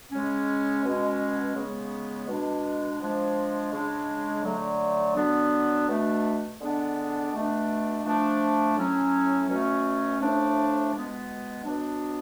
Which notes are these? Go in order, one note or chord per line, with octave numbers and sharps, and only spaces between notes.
C#3 G#3 C#4
B2 G#3 C#4
C#3 G#3 B3
B2 G#3 D4
F3 G#3 D4
C#3 G#3 D4
D3 F#3 A3
D3 F#3 B3 D4
B2 A3 D4
D3 G#3 B3 D4
B2 A3 D4
F3 A3 D4
A2 F#3 C#4
B2 F#3 A3 C#4
A2 F3 A3 D4
B2 G#3 B3
B2 F#3 B3 D4